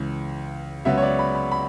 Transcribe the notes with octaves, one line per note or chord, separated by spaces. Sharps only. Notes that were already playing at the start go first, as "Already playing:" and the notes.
Already playing: C#2 C#3 E3
C#2 C#3 F#3 B3 E5
C#5
D5
B5
B5
B5